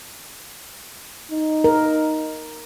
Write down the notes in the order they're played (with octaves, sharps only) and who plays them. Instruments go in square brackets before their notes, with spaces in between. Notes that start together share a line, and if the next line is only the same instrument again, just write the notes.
[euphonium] D#4
[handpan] A#4